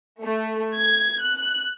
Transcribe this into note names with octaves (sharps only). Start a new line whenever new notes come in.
A3
G#6
F#6